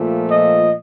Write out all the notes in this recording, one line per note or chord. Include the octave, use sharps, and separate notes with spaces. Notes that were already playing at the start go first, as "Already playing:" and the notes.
Already playing: A#2 F3 A3
D#5